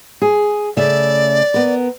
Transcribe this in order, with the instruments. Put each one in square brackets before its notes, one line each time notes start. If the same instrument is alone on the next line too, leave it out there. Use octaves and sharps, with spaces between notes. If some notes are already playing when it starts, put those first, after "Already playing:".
[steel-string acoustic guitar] G#4
[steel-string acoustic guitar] C#3 A3 E5 [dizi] D5
[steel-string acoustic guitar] B3 A#4